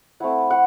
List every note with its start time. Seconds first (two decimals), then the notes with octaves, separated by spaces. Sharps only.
0.20 A3 C4 E4 F#5
0.50 F#5